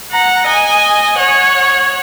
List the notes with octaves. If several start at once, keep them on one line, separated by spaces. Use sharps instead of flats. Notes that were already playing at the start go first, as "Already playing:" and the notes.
F#5 A#5
D#5 G#5
C#5 F#5